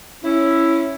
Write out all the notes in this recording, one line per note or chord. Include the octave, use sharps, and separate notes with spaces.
C#4 E4